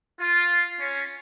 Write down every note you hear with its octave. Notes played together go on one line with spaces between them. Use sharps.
F4
C#4